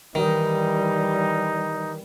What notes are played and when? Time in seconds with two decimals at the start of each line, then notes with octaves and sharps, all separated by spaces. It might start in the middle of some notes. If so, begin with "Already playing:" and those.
0.15 D#3 E3 G3 D#4